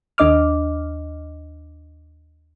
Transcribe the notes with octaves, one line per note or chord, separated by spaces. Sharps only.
D#2 D4 D#5 D6 F6